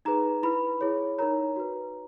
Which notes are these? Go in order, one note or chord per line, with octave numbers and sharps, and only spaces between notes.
D#4 G#4 B4 A#5
E4 B4 B5
E4 G#4 C#5
D#4 A#4 C#5 A#5
F#4 B4